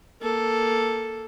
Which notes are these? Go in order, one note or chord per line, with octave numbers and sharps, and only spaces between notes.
A#3 A4